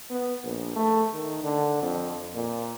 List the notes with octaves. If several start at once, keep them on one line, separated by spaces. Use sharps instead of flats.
B3
A#1
A3
D#3
D3
F2
A#2